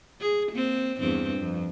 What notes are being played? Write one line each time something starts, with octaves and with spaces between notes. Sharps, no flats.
G#4
A#3 C4
E2 G2 C4
F2